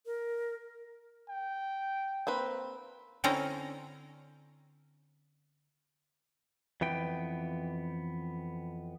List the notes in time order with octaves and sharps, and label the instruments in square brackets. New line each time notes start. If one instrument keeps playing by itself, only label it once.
[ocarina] A#4
[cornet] G5
[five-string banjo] A#3 C4 B4
[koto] D3 C4 C#4 E4 A4 A#5
[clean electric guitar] F2 E3 B3 G5